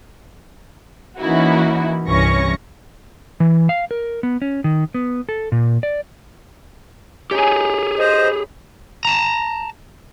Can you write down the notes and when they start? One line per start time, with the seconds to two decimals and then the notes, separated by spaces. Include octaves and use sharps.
1.18 E3 A#3 C#4 D#4 E4 F#4
2.05 C2 G2 E3 C#4 C#6 A#6
3.40 E3
3.69 F5
3.91 A#4
4.23 B3
4.42 C#4
4.64 D#3
4.95 B3
5.29 A4
5.52 A#2
5.83 D5
7.31 C#4 D#4 G4 G#4 C#5
7.99 C5 D#5
8.24 B5
9.05 A5 A#5